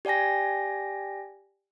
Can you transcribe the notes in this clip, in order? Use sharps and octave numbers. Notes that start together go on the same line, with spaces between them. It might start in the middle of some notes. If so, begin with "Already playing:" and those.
G4 D5 G5 G#5 A#6